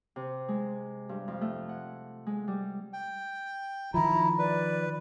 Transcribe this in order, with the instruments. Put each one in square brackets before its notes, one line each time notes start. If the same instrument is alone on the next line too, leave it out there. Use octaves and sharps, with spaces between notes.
[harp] C3
G#3
G2
F2
A3
F#5
G#3
G3
[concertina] G5
[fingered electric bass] D#3 F3 [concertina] E4 [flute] A#5
[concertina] B4 [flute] D5